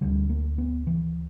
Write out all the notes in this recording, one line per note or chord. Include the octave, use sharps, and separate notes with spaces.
D2 D3 G3
A#3
B3
E3